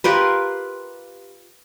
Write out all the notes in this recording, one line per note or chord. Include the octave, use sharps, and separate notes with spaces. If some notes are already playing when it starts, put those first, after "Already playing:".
F4 G4 A#4 B4